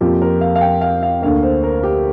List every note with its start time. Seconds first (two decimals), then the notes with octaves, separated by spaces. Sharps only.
0.01 F2 F3 A#3 F4 G4
0.22 A#4
0.41 F5
0.56 F5
0.61 G5
0.81 F5
1.03 F5
1.22 D2 D3 A#3 F5
1.43 C5
1.64 A#4
1.83 G4